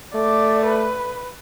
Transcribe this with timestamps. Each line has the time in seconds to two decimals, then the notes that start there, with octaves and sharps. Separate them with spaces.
0.15 A3 D5
0.66 B4